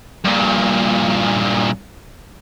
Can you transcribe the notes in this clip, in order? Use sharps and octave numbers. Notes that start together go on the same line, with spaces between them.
G2 A#2